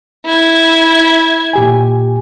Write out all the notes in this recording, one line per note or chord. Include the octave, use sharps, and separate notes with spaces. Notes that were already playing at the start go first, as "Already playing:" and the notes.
E4 G#6
A#2 G4 G#5